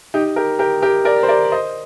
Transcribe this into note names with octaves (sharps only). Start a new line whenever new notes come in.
D#4 G4
G4 A#4
G4 A#4
G4 A#4
A#4 D5
C5
A#4 D5
C5 D#5